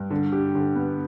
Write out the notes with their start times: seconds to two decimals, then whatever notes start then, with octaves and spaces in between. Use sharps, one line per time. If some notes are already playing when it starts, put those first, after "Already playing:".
Already playing: G2
0.10 D3
0.32 G4
0.55 D3
0.75 B3